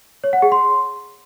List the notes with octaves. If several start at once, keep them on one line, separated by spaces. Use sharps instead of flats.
C#5
F#5
G#4
C6